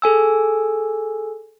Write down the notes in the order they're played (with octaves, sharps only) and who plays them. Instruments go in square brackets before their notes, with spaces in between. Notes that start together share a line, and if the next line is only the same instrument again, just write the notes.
[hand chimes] G#4 A4 G#5 E6